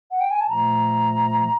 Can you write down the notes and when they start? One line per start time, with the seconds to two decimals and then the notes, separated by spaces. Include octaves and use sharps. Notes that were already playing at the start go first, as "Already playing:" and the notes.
0.11 F#5
0.21 G5
0.31 G#5
0.41 A5
0.49 A#2 F3 A3 A#5